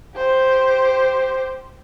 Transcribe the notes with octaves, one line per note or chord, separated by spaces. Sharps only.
G4 C5